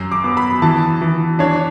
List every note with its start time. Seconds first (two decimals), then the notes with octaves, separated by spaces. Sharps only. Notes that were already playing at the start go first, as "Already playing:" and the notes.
Already playing: F#2
0.12 D6
0.24 B3
0.37 B5
0.62 E3 A5
1.02 E3
1.39 D4 C#5